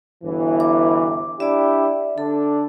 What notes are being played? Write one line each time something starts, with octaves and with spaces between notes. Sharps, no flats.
G1 B2 E3
D6
D4 E4 G4 D5 E5
D3 D4 A4